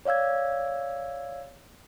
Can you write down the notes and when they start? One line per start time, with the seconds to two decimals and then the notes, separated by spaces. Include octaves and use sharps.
0.05 C#5 D5 F5 E6 G#6